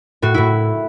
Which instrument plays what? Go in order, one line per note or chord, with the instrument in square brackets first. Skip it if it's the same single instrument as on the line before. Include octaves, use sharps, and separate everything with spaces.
[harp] A2 F#4
A2 E4